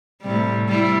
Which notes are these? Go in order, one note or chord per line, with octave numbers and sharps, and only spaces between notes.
A2 C3 G3
G3 E4